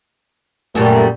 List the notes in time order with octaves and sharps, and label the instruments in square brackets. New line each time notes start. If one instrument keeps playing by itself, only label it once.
[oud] F#2 A#2 G3 [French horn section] A3 A#4